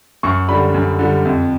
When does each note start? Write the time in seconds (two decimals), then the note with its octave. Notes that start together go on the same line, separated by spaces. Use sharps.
0.23 F#2 C#6
0.49 D3 G3 B5
0.74 F#2
0.99 D3 G3
1.25 F2